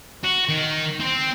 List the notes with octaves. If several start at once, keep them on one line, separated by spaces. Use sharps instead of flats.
F#4
D#3
C4